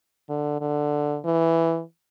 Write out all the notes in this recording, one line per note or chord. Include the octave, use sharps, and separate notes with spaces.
D3
D3
E3